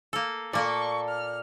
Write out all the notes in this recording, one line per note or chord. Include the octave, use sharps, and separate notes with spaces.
A#3 A4
A#2 A#3 A4 D5 C#6
F6